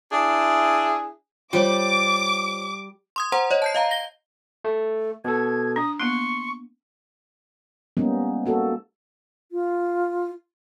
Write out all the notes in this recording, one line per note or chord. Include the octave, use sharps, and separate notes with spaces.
D4 E4 G#4
G3 F4 C5 C#5 D6
C6 D#6 G#6
C5 F#5 A#5 C6
C#5 D#5
A5 G6 C7
D#5 F5 A#5
A#6 G7
A3
B2 A4 G#6
D4 D#6
A#3 B3 C6 C#6
G3 G#3 A#3 B3 C#4 D#4
A#3 F#4 A4
F4